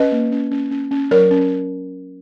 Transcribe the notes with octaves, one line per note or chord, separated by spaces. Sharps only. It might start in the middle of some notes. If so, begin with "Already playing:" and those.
Already playing: C#4 B4 D#5
A#3
C#4
C#4
C#4
C#4
F#3 A#4 C#5
C#4